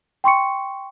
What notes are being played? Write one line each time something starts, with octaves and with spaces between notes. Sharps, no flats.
G5 C6 C#6 C#7